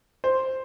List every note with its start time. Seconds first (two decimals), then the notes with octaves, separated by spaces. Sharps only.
0.24 C5